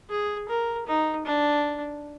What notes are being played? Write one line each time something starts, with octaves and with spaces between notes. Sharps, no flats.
G#4
A#4
D#4
D4